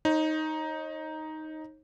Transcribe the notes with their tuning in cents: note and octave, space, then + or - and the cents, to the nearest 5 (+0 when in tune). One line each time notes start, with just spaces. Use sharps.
D#4 +5 C#5 -40